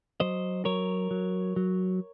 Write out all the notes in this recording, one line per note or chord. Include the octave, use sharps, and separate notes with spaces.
F#3 C5 D#5
F#3 A#4 C#5
F#3
F#3